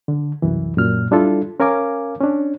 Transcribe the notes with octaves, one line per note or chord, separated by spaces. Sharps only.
D3
C2 F#2 E3
F#2 A#2 F6
G3 D4 E4 F4 A4
C#4 A#4 F5 G#5 D6
C#4 D4